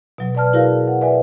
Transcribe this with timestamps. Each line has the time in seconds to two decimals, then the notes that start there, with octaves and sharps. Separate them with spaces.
0.18 B2 F#3
0.35 B4 D5 A5 F6
0.53 E4 F#4 G#4 A#4 D5 F5
0.87 F#5
1.01 B4 D5 E5 G#5